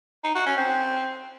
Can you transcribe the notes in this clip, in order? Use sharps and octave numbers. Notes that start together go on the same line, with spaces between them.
D#4
F#4
C#4
C4